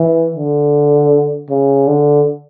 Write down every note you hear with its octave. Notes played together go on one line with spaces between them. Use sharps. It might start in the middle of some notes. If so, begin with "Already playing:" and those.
Already playing: E3
D3
C#3
D3